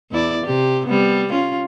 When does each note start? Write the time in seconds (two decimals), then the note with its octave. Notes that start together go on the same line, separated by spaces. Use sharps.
0.11 E2 E4 D5
0.45 C3 G4
0.87 G3 B3
1.30 C#4 F4